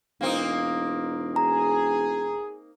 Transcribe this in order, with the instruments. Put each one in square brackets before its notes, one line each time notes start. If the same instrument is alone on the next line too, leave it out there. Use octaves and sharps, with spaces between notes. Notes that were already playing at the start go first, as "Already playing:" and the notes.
[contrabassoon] E1 [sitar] A#3 C4 D#4
[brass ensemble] G#4 [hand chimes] A#5